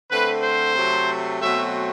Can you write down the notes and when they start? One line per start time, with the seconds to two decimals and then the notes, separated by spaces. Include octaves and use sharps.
0.10 D3 A3 C4 B4
0.43 C5
0.75 C3 F#3 A3
1.40 B2 F#3 A3 C4 E5